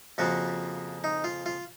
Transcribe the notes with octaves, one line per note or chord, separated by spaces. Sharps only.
F2 C#3 F3 A#3 F#4
D#4
F4
F4